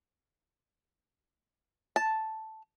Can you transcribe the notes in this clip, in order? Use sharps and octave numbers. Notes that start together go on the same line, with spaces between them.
A5